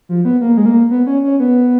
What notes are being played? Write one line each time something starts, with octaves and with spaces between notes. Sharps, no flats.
F3
B3
A#3
G#3
A#3
B3
C#4
C#4
B3